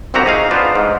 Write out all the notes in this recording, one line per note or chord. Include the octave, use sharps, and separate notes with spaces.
G1 C2 C4 F#4 G4 A#5
D#4 G#4 F5
B3 D4 F4 C5
G#2